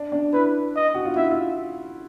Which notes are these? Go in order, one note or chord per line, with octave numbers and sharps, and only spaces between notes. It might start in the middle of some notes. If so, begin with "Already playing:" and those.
Already playing: D4
D4
E4 B4
D#5
F#4
F4
E4 E5
F4